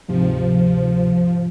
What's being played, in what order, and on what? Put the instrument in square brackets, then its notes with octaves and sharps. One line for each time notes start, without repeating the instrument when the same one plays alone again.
[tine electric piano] D2 G#2 C3 [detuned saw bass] F3